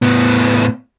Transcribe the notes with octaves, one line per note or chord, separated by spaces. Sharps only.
A2 B3